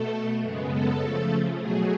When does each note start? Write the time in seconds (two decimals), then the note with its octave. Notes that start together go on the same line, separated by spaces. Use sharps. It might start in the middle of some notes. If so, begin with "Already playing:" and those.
Already playing: B2 A3 A4
0.43 F#2 C#3 G#3 B3
0.72 A4
1.00 C#3 F3 A3
1.58 B2 F#3 A3 G#4